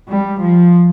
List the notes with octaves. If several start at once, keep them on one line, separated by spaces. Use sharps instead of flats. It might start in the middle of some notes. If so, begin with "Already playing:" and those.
G3
F3